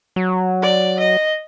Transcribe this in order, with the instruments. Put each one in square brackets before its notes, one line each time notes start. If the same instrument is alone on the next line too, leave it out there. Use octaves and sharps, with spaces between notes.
[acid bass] F#3
[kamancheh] D5
D#5